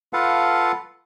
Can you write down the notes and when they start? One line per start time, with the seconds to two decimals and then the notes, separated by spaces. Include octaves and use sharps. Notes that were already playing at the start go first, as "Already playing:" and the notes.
0.13 F4 A4 B4 F5 F#5 A5